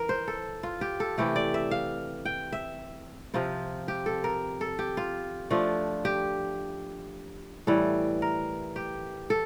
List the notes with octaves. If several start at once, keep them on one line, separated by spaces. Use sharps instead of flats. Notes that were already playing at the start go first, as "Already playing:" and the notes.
Already playing: E3 A#4
C5
A4
F4
G4
A4
C3 E3 A3 G4
D5
E5
F5
G5
E5
C3 F3 C4 F4
G4
A4
A#4
A4
G4
F4
F3 A3 D4 F4
G4
A2 E3 G3 A4
A#4
G4
A4